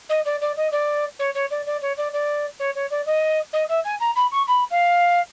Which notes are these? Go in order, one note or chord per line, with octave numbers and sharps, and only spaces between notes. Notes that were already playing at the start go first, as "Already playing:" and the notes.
D#5
D5
D5
D#5
D5
C#5
C#5
D5
D5
C#5
D5
D5
C#5
C#5
D5
D#5
D#5
E5
G#5
A#5
B5
C#6
B5
F5